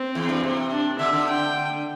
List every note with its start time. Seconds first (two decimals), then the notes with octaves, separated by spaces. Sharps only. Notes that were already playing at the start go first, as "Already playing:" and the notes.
Already playing: C4
0.15 E2
0.29 G2
0.43 C3
0.71 D4
0.99 D3 E5
1.13 D3
1.28 G5